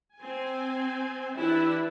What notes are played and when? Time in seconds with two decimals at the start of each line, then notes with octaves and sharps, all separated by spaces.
0.16 C4 G#5
1.36 E3 D4 E4 G4 B4 E5